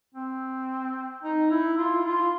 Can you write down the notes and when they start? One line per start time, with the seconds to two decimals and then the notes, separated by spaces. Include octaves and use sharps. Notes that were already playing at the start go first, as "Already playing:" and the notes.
0.14 C4
1.23 D#4
1.51 E4
1.77 F4
2.05 F4